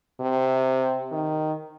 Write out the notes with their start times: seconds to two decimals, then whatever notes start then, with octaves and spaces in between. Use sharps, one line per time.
0.20 C3
1.12 D#3